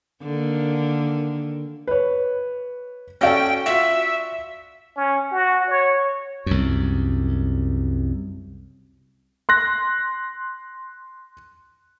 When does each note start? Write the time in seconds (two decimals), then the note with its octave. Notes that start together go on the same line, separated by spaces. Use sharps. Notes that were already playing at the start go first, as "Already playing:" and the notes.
0.23 D3 D#3 A#3
1.87 B4 C#5
3.21 C#4 F#4 A4 D5 F5 G5 A#6
3.66 F4 F#4 E5
4.96 C#4
5.31 F#4
5.69 C#5
6.46 C2 F#2
9.49 C6 F#6 A#6